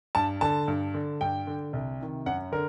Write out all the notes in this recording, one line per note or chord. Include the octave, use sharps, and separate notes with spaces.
G2 A5
D3 A5
G2
D3
G2 G5
D3
C2
C3 D#3
F#2 F#5
D3 A#4